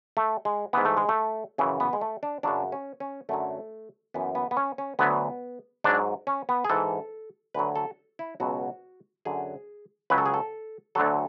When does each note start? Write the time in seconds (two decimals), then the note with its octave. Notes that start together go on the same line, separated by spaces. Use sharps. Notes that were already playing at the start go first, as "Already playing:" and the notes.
0.17 A3
0.45 G#3
0.73 G#2 E3 B3
0.85 A3
0.97 G#3
1.09 A3
1.58 F#2 C#3 E3
1.80 B3
1.93 G#3
2.01 A3
2.23 D4
2.43 F#2 C#3 F#3 D4
2.72 C#4
3.00 C#4
3.29 F#2 D3 F#3 A3
4.14 F#2 E3 B3
4.35 B3
4.51 B3
4.57 C#4
4.78 C#4
4.99 D2 D3 F#3 B3
5.84 G#2 F#3 D4
6.27 C#4
6.49 B3
6.65 G#4
6.70 G#2 E3 A4
7.54 D2 D3 F#3 B4
7.76 A4
8.19 E4
8.40 C#2 B2 F#3 F#4
9.25 F#2 D3 F#3 G#4
10.10 C#2 C#3 F#3 B4
10.18 A4
10.26 G#4
10.34 A4
10.95 D2 D3 F#3 A4